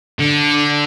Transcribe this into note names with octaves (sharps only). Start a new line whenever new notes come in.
D3